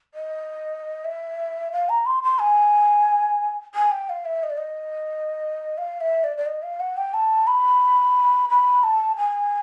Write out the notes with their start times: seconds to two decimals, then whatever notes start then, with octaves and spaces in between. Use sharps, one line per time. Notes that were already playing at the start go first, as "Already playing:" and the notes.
0.14 D#5
1.05 E5
1.72 F5
1.89 A#5
2.06 C6
2.23 C6
2.39 G#5
3.75 G#5
3.91 G5
4.09 F5
4.25 E5
4.43 D#5
4.50 D5
4.58 D#5
5.78 F5
6.01 E5
6.24 D5
6.37 D5
6.46 D#5
6.63 F5
6.80 F#5
6.97 G5
7.14 A5
7.47 B5
8.49 B5
8.84 A5
9.17 G#5